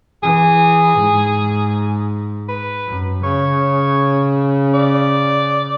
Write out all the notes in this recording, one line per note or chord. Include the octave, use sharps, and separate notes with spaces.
E3 G#4
G#2
B4
F#2
C#3 C#5
D5